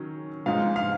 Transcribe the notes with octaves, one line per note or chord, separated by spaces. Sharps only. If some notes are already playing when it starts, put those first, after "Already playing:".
Already playing: D#3 F#3 C#4
G#2 F3 G#3 D#4 F5
F5